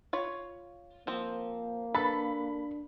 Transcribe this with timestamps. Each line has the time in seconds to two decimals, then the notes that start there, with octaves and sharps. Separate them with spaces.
0.13 F4 C#5 B5
1.07 F3 A#3 C4
1.95 D4 A4 B4 B5